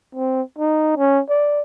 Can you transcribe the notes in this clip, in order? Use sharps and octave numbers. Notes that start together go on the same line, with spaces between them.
C4
D#4
C#4
D5